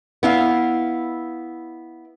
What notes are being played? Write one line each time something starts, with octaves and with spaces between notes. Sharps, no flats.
B3 E4 F5